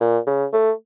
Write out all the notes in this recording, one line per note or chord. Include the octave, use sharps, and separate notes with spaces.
A#2
C#3
A3